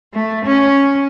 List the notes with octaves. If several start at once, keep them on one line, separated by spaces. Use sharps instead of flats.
A3
C#4